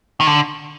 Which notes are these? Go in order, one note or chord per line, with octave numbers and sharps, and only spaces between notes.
D#3
D3